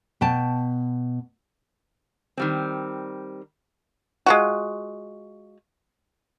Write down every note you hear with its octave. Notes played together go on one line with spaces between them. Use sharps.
B2 G5 A5
D#3 G3 C4
G#3 F4 F#4